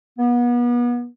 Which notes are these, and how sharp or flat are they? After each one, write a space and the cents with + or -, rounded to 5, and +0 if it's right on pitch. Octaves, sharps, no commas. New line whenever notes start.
B3 -35